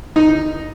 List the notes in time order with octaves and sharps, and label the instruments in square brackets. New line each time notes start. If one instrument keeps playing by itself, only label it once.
[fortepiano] D#4